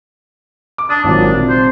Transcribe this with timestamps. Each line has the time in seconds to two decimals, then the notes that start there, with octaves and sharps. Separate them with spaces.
0.78 D6
0.90 D4 D#6
1.04 G#1 A#2 F#3 D4
1.36 C3
1.49 C5